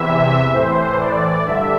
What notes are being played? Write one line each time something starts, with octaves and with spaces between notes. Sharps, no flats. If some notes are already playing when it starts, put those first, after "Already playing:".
Already playing: E2 C3 E3 E5
A2 E3 C5
D5
G2 D3 E5